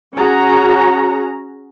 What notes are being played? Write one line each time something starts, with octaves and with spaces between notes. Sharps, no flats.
C#4 F#4 G#4 A#5